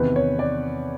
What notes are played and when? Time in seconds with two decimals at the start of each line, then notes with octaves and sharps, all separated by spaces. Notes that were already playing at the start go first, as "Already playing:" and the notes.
Already playing: E2 C3 D#3 B4
0.16 C#5
0.39 D5